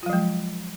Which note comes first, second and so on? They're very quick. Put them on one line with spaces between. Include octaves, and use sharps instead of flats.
F4 F#3 F3 G#3